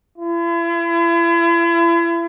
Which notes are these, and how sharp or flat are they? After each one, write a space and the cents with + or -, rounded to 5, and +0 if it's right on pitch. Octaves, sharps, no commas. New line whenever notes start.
E4 +40